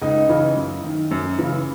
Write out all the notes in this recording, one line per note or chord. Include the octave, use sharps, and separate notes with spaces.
C#2 D#4
C#3 E3
F#2
D#3
F#2
C#3 E3